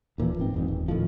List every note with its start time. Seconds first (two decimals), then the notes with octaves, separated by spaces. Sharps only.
0.18 D#1 A#2 E3 F3
0.39 G#2 C4
0.54 F#1 E2 G#2
0.68 D#1
0.88 A2 D#3 F3